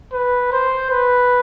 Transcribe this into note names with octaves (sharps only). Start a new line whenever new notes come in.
B4
C5
B4